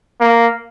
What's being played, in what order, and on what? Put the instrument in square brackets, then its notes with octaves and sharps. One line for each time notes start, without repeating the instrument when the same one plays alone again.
[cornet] A#3